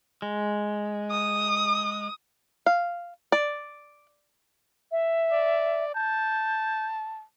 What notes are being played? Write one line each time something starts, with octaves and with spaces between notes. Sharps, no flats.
G#3
D#6
F5
D5
E5
D5
A5 G6